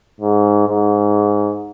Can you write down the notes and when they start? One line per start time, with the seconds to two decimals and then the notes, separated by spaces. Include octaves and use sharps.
0.20 G#2
0.67 G#2